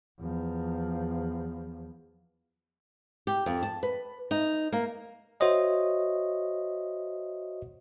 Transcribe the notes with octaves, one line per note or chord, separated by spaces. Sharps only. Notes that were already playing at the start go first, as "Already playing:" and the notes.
E2 F3
G4
F2
A5
B4
D#4
A#3
F#4 C5 C#5 D#5 E5